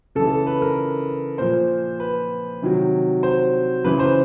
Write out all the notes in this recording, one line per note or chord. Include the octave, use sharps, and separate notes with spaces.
C#3 E3 A4
A4
B4
A#4
A#2 F3 C5
B4
C3 D#3 F#3
C5
C#3 E3 B4
C5